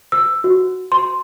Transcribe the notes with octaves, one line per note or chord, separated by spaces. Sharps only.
E6
F#4
C6